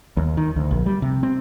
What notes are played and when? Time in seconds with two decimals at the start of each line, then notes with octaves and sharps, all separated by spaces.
0.17 D#2
0.37 D#3
0.56 D2
0.71 A#1
0.86 G3
1.02 C3
1.23 C4